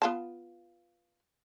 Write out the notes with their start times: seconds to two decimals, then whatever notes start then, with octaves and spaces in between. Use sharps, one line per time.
0.02 B3 F4 A5